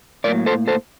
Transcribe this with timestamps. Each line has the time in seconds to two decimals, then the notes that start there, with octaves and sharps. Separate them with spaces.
0.24 A2 F#3 A#3 A#4 D5
0.46 A4 C5
0.68 A4 C5